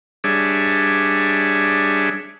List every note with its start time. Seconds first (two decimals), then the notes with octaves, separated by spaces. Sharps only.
0.24 G3 D4 G#4 C#5 E5